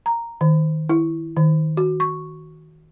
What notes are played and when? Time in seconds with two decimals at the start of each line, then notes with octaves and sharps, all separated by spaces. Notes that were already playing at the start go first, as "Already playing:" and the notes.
0.06 A#5
0.41 D#3
0.89 E4
1.37 D#3
1.77 F#4
2.00 C#6